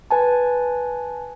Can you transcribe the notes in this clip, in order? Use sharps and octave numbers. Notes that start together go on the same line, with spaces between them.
B4 G#5 A5